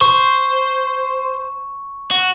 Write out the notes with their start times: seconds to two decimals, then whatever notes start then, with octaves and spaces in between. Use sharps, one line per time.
0.01 C5 C#6
2.11 F#4